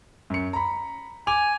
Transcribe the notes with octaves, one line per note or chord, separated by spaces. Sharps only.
F#2 C#7
A#5 B5
G#5 D6 F7